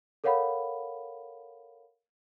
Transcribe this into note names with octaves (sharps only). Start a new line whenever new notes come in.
A4 A#4 C#5 F5 F#5 B5